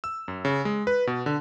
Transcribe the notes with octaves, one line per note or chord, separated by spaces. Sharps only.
E6
F#2
C#3
G#3
B4
B2
D3